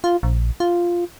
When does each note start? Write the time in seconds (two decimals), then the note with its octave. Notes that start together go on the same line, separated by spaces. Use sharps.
0.04 F4
0.23 A#1
0.60 F4